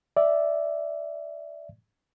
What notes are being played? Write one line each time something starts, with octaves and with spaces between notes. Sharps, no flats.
D5 E5